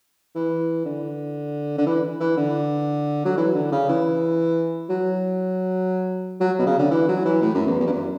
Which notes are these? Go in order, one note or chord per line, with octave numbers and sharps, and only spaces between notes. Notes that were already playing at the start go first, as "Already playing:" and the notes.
E3
D3
D3
E3
E3
D3
F#3
E3
D3
C#3
E3
F#3
F#3
B2
C#3
D3
E3
F#3
E3
A2
F#2
E2
E2
G2
F#2